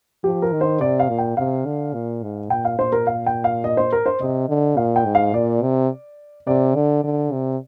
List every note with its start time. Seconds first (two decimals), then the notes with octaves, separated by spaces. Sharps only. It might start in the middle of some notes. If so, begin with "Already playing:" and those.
0.24 F3 G4
0.42 A#4
0.52 D#3
0.61 C5
0.80 C3 D5
1.00 F5
1.09 A#2
1.18 G5
1.37 C3 F5
1.65 D3
1.94 A#2
2.23 G#2
2.50 A#2 G5
2.65 F5
2.79 A#2 C5
2.92 A#4
3.07 F5
3.26 G5
3.44 F5
3.64 D#5
3.77 C5
3.93 A#4
4.06 C5
4.21 C3 D#5
4.49 D3
4.77 A#2 F5
4.96 G5
5.05 G#2
5.15 F5
5.34 A#2 D5
5.63 C3
6.47 C3 D5
6.75 D3
7.04 D3
7.32 C3